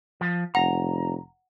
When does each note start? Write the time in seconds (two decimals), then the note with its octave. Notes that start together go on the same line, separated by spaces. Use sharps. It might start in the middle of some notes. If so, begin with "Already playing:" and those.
0.21 F3
0.55 F1 F#5 A#5